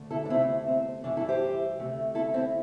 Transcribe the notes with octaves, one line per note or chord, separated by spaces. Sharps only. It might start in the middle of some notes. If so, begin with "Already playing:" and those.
Already playing: D2 D3 A3
E4 A4
D4
D2 C3 A3 C4 E4
C4
G2 E3 A3 D4
E4 A4
G4 C5
D2 C3 A3
E4 A4
C4 E4